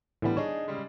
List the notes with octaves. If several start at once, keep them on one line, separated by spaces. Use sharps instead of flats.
A2 D3 E3 G3 B3
D4 D#4 G#4 C#5
C#3 G3 G#3